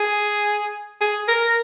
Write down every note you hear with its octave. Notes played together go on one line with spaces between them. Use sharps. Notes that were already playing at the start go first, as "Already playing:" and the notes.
Already playing: G#4
G#4
A#4